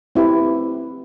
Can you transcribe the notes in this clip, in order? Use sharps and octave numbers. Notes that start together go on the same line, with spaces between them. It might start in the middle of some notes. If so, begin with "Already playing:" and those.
C4 E4 G4 B4